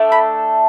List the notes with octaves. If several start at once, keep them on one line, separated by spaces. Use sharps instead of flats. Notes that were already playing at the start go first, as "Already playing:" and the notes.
Already playing: A3 D4 A4
B5